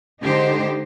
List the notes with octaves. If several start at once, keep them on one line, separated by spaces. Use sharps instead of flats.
D3 G#3 D#4 G4 C5